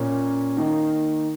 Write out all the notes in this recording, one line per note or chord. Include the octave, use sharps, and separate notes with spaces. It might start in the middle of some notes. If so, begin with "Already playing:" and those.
Already playing: A#2 A#3 C#4
D#3 A#3 D#4